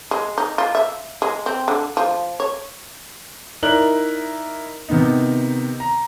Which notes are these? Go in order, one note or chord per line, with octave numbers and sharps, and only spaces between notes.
G#3
D#4
F4
E5
G#3
C4
D3
F3
C#5
D#4 E4 A#4 D5 F#6 F#7
C3 D#3 B3 D#4
A#5